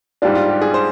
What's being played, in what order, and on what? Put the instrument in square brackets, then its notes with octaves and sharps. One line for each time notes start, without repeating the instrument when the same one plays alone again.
[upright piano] G#2 G3 D4 [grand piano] F4
[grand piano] F4
G4
G#4
C5